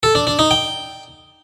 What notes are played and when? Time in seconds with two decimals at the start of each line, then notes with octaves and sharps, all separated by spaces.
0.03 A4
0.15 D4
0.27 D4
0.39 D#4
0.51 G5